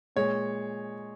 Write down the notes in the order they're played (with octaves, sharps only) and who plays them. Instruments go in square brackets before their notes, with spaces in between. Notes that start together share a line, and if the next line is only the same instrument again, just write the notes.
[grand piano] A#2 G#3 C#5